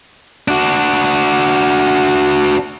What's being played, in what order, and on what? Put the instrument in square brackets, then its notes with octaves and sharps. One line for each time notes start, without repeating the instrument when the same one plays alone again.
[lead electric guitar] D4 F#4